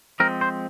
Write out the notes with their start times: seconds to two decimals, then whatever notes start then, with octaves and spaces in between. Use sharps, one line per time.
0.20 F3 G#3 C4 A#4
0.41 C5